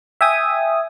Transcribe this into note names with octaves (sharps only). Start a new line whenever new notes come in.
E5 G5 G#5 D#6